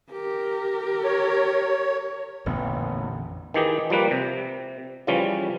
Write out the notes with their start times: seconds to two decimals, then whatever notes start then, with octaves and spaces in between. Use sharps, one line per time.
0.11 G4 A#4
1.04 C#5
2.46 A1 F2 A#2 D3 B3
3.54 D#3 E3 G4 G#4
3.90 F3 G3 A#3 B4
4.11 C3
5.07 C#3 E3 F3 G3 C#4